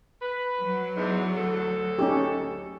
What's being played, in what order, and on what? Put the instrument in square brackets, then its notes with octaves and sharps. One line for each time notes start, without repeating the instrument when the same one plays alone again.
[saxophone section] B4
[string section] F#3
[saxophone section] E2 G#2
D2 A4
[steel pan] C#4 D#4 G4